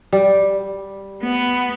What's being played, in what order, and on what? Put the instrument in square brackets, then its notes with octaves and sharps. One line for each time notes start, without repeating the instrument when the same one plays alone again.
[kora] G3
[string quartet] B3